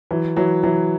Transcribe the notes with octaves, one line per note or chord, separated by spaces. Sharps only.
E3 F#3
E3 F#3
E3 F#3